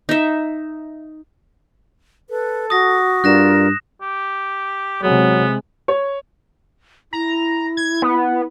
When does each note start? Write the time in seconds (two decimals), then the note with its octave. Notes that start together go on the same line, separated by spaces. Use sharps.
0.09 D#4 E5
2.30 A4 B4
2.70 F#4 D#6 A#6
3.24 G2 F4 A#4 D5 F#6 A#6 E7
4.01 G4
5.02 C3 F#3 G#3 B3
5.88 C#5
7.13 E4 A#5
7.77 G#6
8.02 B3